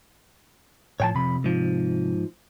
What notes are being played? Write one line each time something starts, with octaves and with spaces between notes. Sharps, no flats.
A2 F3 C#5 G5 A5
F2 C3 B5
G#2 F3